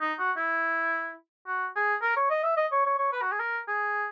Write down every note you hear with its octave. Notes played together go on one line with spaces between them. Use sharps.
D#4
F#4
E4
F#4
G#4
A#4
C#5
D#5
E5
D#5
C#5
C#5
C#5
B4
F#4
G#4
A#4
G#4